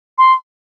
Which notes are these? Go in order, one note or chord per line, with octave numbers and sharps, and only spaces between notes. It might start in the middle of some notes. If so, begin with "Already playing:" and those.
C6